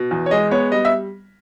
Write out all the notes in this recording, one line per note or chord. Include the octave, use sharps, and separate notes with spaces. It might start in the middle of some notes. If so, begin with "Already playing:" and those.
Already playing: B2
E2
C#5
G#3 D#5
B3 C#5
G3 D#5
E5